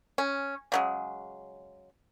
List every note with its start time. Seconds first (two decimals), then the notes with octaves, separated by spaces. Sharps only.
0.18 C#4
0.72 C#3 F#3 G#3